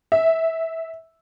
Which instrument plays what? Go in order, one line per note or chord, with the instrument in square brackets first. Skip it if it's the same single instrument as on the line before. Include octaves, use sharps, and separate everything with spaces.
[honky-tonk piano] E5